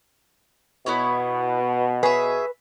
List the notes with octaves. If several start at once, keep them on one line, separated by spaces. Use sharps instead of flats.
B2 B3 E4 C#5
G#4 B4 C#5 E5